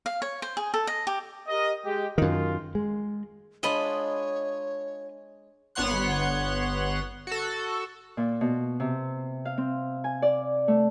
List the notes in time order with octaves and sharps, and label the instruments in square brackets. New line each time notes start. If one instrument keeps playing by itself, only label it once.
[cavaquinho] F5
C#5
C5
G#4
A4
D#5
G4
[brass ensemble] G4 A#4 D#5
G#3 G4
[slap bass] F#2 D#3 [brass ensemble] F4
[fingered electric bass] G#3
[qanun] G#3 D4 [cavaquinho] F4 D#5 B5 [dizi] C#5
[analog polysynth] G1 B3 C#5 F#5 C6 F#6
F#4 A4
[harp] A#2
B2
C3
F5
C4
G#5
D5
A3